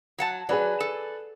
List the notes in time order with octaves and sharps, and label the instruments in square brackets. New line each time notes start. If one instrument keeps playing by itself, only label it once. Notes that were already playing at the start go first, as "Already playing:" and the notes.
[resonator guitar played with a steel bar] F#3 F#5 A5
[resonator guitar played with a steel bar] F#3 [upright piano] G#4 B4 D5
[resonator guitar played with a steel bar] A4